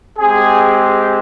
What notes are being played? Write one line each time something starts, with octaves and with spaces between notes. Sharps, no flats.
G#3 C4 G4 G#4